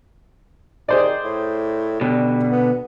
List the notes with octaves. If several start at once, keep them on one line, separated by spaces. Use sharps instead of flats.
D#3 G#4 C5 D5
A2
B2 D3 G3
B3